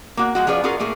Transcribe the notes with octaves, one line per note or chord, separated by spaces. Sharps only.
A#3 F#4
F3 G#3 F#4
F3 C#4 F4 G#4 B4 D5
C#4 F4 F#4 G#4 A#4
A2 A3 A#3 G#4